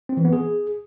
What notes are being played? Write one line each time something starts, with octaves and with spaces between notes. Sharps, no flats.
C4
E3
B3
G#4